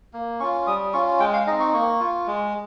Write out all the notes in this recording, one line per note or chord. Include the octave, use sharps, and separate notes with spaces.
A#3
C#4 F4 C#6
G3 D#6
C#4 F4 C#6
G#3 G5
F5
C4 D#4 D#5
C#6
A#3 C#6
F4
G#3